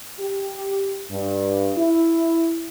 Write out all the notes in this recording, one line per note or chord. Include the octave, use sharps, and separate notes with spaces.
G4
G2
E4